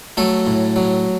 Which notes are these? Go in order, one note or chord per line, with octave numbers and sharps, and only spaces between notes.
F#3 A3 A4
A2
F#3